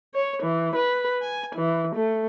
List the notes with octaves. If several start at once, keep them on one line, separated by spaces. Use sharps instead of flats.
C#5
E3
B4
G#5
E3
A3